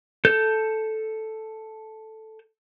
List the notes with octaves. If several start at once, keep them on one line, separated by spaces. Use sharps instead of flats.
A4 G6